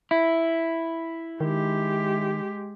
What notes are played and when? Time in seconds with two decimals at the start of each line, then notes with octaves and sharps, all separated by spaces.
0.11 E4
1.40 D#3 G#3 G4